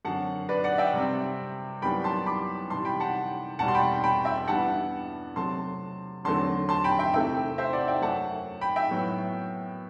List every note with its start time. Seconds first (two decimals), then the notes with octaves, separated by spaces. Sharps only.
0.05 F#2 D3 F#3 C4 F#5 A5
0.49 B4 D5
0.64 D5 F#5
0.78 E5 G5
0.93 C3 G3 C4
1.82 F#2 E3 G3 B3 G5 B5
2.04 A5 C6
2.26 B5 D6
2.70 C3 E3 G3 A5 C6
2.85 G5 B5
3.00 F#5 A5
3.59 E2 B2 G3 F#5 A5
3.68 C6
3.75 G5 B5
4.04 G5 B5
4.25 E5 G5
4.48 G2 E3 G3 B3 F#5 A5
5.36 C3 F#3 A3 C4 A5 C6
6.25 E2 D3 F#3 A3 C4 A5 C6
6.69 A5 C6
6.84 G5 B5
6.99 E5 G5
7.13 C3 E3 A3 C4 E5 G5
7.58 C5 E5
7.73 D5 F#5
7.88 E5 G5
8.02 F#2 F#3 A3 F#5 A5
8.61 G5 B5
8.76 E5 G5
8.91 A2 F#3 B3